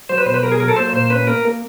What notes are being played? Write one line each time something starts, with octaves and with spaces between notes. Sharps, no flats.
F#3 C5
B4
B2 C5
B4
F#3 A#4
G#4
F#3 A#4
A4
A#3 C5
A#2 C5
C#4 B4
A#3 A#4
A#3